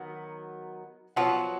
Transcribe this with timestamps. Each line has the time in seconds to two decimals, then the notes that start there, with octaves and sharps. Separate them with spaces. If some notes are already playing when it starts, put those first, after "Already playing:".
Already playing: D#3 F#3 B3
1.16 F3 F#3 B3 F#4